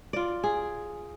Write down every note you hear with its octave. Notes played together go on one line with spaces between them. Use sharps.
F4 D5
G#4